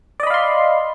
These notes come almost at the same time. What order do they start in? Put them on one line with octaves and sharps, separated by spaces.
D5 D#5 B5 F5 C6